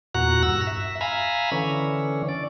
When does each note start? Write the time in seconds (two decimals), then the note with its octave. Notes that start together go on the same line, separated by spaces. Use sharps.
0.14 E2 A#2 F#4 F#5 A#5 F#6
0.43 G2 E6 A#6
0.67 E5
1.01 E5 F5 G#5 A#5 B5
1.52 D3 E3 C#4
2.29 D5